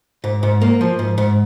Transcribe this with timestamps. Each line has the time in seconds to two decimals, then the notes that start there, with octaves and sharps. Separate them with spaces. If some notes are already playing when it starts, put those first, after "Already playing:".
0.24 G#2
0.43 G#2
0.61 A#3
0.81 F3
0.99 G#2
1.18 G#2